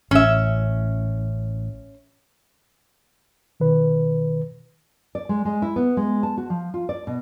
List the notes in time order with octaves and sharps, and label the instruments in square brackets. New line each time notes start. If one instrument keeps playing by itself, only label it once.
[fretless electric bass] A1 [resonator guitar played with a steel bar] C#4 E5
[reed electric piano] B2 D#3 B4
[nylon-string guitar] D5
G#3
G#3
E4
B3
G#3
A5
F#4
F3
F4
D5
B2